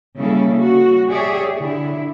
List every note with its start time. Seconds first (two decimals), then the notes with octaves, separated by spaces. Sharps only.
0.18 C#3 G3 A#3 E4 A4
0.59 F#4
1.09 G4 G#4 C#5 D5 E5
1.56 D3 E4